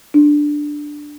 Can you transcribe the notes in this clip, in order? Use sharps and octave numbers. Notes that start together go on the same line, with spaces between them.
D4